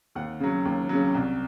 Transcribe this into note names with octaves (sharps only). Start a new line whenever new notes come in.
D#2 F#5
C#3 F#3
D#2
C#3 F#3
C2